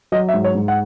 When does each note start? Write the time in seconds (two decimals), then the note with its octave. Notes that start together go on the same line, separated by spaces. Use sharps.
0.12 F#3 D#5
0.29 E5
0.34 G#2
0.44 C#5
0.55 G#2
0.68 F#5